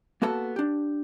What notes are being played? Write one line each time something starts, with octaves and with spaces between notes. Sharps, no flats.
A#3 B3 F#4 A4 A5
D4 G4